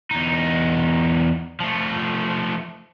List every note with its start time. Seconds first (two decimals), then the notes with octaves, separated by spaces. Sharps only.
0.11 E2 D#4
1.60 F3 A3